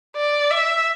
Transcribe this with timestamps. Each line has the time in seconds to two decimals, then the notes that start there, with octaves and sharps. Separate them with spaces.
0.16 D5
0.51 E5